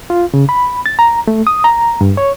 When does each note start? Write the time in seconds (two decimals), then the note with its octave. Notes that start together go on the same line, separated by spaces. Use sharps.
0.10 F4
0.34 C#3
0.49 B5
0.86 A6
0.99 A#5
1.28 A3
1.47 D#6
1.64 A#5
2.01 G2
2.17 C#5